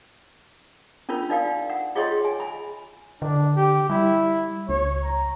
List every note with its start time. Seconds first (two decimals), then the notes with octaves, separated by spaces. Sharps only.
1.09 C#4 D4 F4 A#4 B5
1.30 D#4 D5 F5 G5
1.70 F#5
1.95 F4 G#4 C#5 D#5 G5 C6
2.25 G#5
2.40 G#5 B5
3.22 D3 D4
3.56 G4
3.90 G3 E4
4.69 C#2 C#5
5.03 A#5